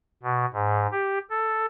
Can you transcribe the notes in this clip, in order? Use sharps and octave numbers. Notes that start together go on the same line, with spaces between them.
B2
G#2
G4
A4